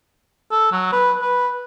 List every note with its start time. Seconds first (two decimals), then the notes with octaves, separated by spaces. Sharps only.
0.52 A4
0.72 F#3
0.92 B4
1.22 B4